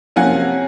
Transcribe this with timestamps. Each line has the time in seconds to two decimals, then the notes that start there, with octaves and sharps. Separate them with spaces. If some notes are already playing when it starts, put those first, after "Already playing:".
0.16 C3 F3 A#3 C#4 F#5 G#5